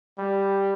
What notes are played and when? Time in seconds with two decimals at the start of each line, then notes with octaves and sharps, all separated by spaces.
0.18 G3